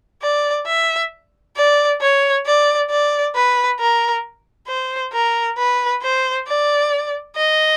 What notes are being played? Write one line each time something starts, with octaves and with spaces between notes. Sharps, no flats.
D5
E5
D5
C#5
D5
D5
B4
A#4
C5
A#4
B4
C5
D5
D#5